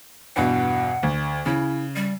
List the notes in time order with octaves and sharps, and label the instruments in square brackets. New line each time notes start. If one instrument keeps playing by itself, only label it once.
[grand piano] E2 G2 B2 [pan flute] F#5
[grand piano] D2
[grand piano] C#3 [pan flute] E4
[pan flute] G3